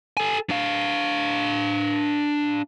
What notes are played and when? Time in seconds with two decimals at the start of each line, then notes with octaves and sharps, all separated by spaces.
0.17 A4 G#5
0.50 D4 F5